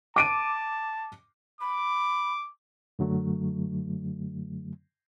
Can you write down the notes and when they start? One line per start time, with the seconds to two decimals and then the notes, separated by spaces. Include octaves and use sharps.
0.16 A5 D6 D7 D#7
1.61 B5 D6
2.99 F#2 D3 F#3 A3